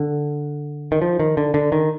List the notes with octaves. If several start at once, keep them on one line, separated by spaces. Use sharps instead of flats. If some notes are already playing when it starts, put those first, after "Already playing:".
Already playing: D3
D#3
F3
D#3
D3
D3
D#3